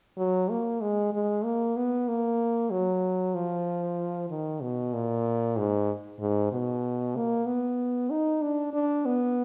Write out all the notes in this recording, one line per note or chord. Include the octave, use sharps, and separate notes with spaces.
F#3
A#3
G#3
G#3
A#3
B3
A#3
F#3
F3
D#3
B2
A#2
G#2
G#2
B2
A#3
B3
D#4
D4
D4
B3